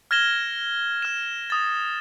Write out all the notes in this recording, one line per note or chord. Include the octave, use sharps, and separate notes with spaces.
F6 G#6 A#6 E7 G7
F6 E7
D#6 A6